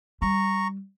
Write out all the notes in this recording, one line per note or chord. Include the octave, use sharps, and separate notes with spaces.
G3 A#5 C#6